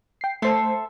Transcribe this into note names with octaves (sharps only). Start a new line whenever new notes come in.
G5 C7
A3 A4 C5 E5 C6